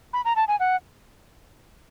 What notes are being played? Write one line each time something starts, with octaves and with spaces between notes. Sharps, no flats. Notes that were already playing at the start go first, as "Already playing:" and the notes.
B5
A#5
A5
G#5
F#5